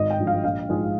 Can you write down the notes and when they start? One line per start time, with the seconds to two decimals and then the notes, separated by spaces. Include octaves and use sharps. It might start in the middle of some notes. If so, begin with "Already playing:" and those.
Already playing: G#1 D#5
0.10 G5
0.19 G2 F3 G#3
0.27 F5
0.44 A#1 F5
0.69 G#2 F3 G#3